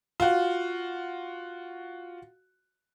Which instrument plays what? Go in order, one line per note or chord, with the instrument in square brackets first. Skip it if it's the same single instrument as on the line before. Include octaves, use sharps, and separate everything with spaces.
[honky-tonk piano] F4 F#4